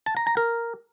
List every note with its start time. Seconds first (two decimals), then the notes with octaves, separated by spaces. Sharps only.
0.06 A5
0.17 A#5
0.27 A#5
0.37 A#4